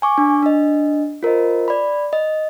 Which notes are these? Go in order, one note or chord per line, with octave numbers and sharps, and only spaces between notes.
G#5 C#6 D6
D4
D4 D#5
F4 A#4 C5 D#5
D5 B5
D#5